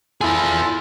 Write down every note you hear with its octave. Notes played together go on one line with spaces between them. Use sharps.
E4 F4 G#4 A4